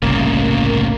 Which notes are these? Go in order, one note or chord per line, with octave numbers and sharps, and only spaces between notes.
G1 C2 A2 C#3 A#3